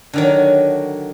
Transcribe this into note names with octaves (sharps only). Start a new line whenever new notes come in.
D3 D#3 F#3